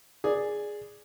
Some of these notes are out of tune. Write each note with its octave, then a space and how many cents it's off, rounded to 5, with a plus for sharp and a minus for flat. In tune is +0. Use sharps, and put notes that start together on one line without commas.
G#4 +0 D5 +0